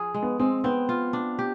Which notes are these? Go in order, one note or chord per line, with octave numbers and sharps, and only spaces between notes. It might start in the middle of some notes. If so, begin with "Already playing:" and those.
Already playing: F3 F4 G#4
G#3
B3
G#3 C4
B3 C4
F4
D4
G4